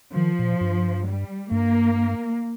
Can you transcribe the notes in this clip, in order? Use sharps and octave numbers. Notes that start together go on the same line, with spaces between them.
D#3 F3
A#2
G2
G3
G2 A#3